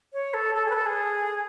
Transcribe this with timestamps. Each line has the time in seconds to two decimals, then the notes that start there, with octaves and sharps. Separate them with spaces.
0.13 C#5
0.34 A4
0.55 A4
0.66 G#4
0.70 B4
0.75 A4
0.86 G#4